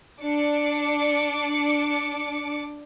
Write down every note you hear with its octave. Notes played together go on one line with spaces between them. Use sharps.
D4 D6 C#7